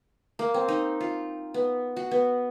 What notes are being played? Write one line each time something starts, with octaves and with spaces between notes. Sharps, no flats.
A#3
C4
D#4
F4
B3
F#4
B3